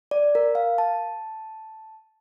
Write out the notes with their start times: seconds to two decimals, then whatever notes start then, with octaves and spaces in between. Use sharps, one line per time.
0.11 D5
0.35 A#4
0.55 F5
0.78 A5